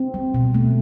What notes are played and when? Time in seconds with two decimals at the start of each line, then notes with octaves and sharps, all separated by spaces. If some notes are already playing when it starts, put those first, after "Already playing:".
Already playing: C4
0.14 G3
0.34 B2
0.54 A3